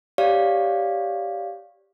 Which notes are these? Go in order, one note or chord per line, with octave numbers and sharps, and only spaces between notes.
G4 C#5 D5 F5